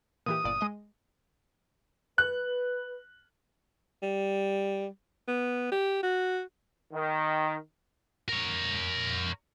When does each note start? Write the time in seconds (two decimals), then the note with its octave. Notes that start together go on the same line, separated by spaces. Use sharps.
0.26 A#2 E3 G4 D#6
0.44 G1 A#2 D5
0.61 G#3 D#5
2.18 B4 F#6
4.03 G3
5.28 B3
5.72 G4
6.03 F#4
6.93 D#3
8.29 A#4 C#5